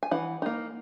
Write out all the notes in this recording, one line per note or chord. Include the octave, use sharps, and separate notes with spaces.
G#5
E3 F#5
A#3 D#4